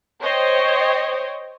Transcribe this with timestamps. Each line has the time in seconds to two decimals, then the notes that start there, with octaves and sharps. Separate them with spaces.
0.23 C5 C#5 D#5 G5